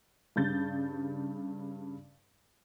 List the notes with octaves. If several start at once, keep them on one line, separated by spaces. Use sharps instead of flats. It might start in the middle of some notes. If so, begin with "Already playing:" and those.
G2 C#3 G6 A6